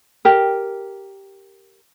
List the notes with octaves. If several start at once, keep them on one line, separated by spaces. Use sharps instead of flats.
G4 A#4